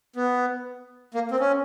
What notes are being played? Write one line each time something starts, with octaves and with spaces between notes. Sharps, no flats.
B3
A#3
C4
C#4